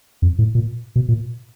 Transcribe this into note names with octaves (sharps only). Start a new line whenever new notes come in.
F2
A2
A#2
B2
A#2